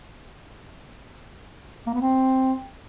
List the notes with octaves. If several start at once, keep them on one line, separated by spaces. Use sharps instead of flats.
A#3
B3
C4